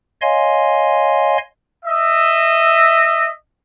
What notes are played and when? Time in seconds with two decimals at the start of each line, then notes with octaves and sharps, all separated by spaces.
0.21 C#5 D#5 F5 G#5 C6
1.85 D#5 E5